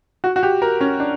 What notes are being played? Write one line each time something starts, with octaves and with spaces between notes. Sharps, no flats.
F#4
F#4
G4
A#4
C#4
D4